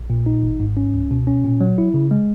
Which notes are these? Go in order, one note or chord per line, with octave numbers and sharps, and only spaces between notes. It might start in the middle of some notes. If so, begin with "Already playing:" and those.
Already playing: A#1
A#2
D#4
G#1
G#2
C#4
C#2
B2
C#4
A#2
F#3
E4
C#3
G#3